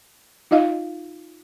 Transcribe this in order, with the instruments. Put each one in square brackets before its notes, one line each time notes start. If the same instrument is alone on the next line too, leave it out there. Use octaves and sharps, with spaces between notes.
[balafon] D#4 F4 D#5 F5